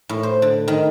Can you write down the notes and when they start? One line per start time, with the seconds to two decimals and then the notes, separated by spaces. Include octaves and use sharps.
0.09 A2
0.23 C5
0.42 D3
0.68 D#3